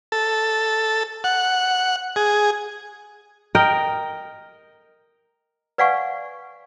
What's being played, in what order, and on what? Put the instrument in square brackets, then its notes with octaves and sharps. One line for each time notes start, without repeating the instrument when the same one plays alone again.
[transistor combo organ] A4
F#5
G#4
[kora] A#4 D#5 G5
[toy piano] B4 D5 F5 F#5 G#5 C#6